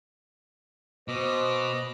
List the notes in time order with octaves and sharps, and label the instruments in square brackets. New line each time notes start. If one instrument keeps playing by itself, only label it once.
[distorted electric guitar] B2 [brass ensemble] C5 [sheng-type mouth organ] D#5 D6